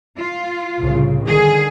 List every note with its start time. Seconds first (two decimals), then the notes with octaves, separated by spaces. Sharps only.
0.18 F4
0.81 C2 A2 C#3
1.27 D3 D#3 G#4